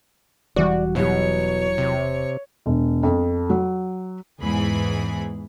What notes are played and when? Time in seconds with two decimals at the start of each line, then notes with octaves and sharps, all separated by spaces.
0.56 E1 E3 G3 F#4 D5
0.95 B2 F#3 E4 G4 C#5
1.78 C3
2.66 E1
3.03 F2
3.50 F#3
4.40 E2 G#2 E3 G#4 B5